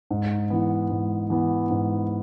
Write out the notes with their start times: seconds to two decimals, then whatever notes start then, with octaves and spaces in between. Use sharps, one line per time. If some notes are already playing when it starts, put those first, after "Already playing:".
0.11 G#2
0.50 E3 B3
0.90 G#2
1.30 E3 B3
1.70 G#2